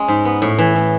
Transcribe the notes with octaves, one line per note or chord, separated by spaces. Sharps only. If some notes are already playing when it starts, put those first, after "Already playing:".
Already playing: G#3 C#4
G#2
B3
A2
E3
A2